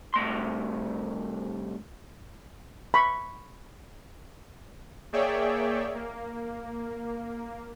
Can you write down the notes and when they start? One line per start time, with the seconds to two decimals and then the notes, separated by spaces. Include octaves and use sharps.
0.14 C2 A3 C6
2.94 B5 C#6
5.13 A#3 G#4 C#5 D5 E5 G5
5.95 A#3